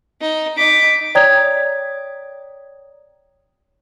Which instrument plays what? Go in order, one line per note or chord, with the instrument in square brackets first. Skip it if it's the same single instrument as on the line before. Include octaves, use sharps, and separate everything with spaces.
[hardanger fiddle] D#4
[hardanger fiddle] D#4 D6 [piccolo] B6
[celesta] C#5 D5 G5 A#5 D#6 G#6